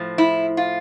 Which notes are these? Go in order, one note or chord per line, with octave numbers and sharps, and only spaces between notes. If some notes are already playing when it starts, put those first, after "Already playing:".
Already playing: A2 F3
E4
F4